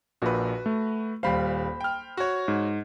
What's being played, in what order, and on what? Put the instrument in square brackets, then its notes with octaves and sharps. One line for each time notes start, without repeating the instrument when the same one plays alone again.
[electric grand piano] A#1 A#2 [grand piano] F#4 B4
[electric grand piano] A3
[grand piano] D#1 G3 F5 [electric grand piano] C5 B5
[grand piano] G5 F6
F#4 C#5
[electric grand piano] G#2